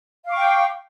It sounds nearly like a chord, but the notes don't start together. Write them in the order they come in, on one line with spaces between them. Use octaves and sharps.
F5 D6 C#6 G5